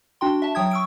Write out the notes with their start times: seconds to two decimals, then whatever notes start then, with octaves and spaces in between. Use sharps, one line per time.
0.21 D4 F#4 G5 C6
0.42 E5 A5
0.55 F#3 G5 D#6 G#6
0.71 C#6 E6 D7